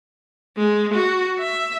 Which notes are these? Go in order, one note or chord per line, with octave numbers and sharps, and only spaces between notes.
G#3
F#4
E5